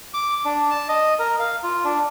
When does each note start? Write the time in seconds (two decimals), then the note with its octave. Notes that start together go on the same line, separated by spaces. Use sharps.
0.14 D6
0.45 D4
0.71 A5
0.89 D#5
1.19 A#4
1.40 F5
1.63 F4
1.84 D4